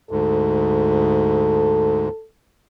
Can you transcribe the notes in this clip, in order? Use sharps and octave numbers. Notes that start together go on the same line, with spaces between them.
D2 G#2 A4